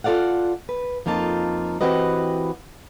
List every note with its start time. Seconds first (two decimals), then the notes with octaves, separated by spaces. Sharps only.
0.04 F4 A4 D5 F5 F#5
0.69 B4
1.06 F2 A#3 D#4 F4 A5
1.81 E3 C4 F#4 G4 B4 D#5